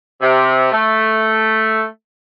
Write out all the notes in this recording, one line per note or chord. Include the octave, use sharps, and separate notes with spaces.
C3
A3